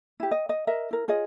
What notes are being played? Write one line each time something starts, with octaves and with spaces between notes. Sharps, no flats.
E4 G4
D#5
D#5
A#4 D#5 E5
E4 A#4
F4 G#4 C#5 D#5